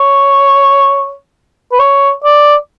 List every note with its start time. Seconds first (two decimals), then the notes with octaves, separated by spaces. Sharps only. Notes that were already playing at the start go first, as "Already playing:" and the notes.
Already playing: C#5
1.72 B4
1.79 C#5
2.24 D5